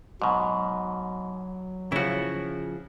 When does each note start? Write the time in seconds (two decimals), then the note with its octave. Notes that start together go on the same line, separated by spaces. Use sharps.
0.22 G#2 B2 F#3
1.92 C#3 F3 E4 F#4